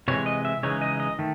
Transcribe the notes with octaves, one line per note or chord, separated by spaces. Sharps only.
C3 E3 G#3 C#5
D#5
E5
C#3 E3 G#3 D#4 C#5
D#5
D#5
D#3 A3